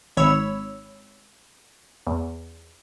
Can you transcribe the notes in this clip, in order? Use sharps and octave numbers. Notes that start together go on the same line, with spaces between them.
G#1 C#5 B5 E6
E2